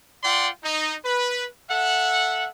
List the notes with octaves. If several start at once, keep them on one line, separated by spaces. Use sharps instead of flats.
F4 D5 F#5 G5 C6
D#4
B4
A4 E5 F#5